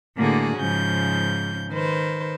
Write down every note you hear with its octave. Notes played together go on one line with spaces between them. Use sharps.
A2 D3 A#3 F#4 G#4
G#2 C#3 F3 G6
D#3 B4 C5